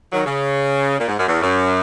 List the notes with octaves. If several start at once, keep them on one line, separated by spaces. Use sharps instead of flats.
D#3 F#3
C#3
A#2
G#2
F#2
E2
F#2